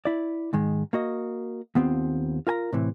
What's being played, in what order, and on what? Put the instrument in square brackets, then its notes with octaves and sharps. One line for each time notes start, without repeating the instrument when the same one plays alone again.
[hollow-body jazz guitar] E4 D5
G#2 D#3 G#3
A#3 F#4 D#5
D#2 B3 C4 F4
F4 A#4 G#5 A#5
A2 C3 E3